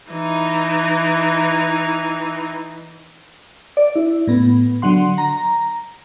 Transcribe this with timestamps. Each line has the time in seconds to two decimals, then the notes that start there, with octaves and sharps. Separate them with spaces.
0.11 E3 D#4
3.77 D5
3.96 E4
4.27 A2 B3
4.82 D3 F#3 F#5 C6
5.18 A#5